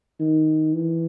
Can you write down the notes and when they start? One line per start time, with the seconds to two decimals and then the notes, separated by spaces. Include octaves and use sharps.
0.20 D#3
0.73 E3